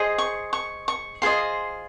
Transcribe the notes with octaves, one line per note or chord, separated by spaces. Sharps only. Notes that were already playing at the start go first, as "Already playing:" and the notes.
Already playing: G#4 C5 D#5
C#6
C#6
C#6
F4 G#4 C5 D#5 C6